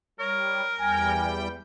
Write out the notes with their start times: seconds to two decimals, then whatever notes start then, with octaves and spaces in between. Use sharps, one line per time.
0.19 G3 A#4 C#5
0.80 E2 G3 G5 G#5